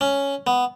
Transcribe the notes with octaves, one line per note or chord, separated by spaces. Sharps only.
C#4
B3